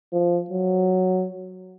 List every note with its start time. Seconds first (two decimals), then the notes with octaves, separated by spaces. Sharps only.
0.13 F3
0.50 F#3